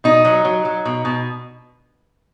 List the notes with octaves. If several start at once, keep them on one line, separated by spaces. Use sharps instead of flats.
B2 D#4
F#3
F#3
F#3
B2
B2